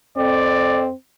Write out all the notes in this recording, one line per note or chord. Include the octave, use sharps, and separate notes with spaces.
F2 C4 D5